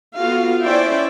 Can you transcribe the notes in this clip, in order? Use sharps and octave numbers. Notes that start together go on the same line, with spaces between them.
B3 F4 F#4 A4 F5
C#4 E4 C5 D5 E5 G5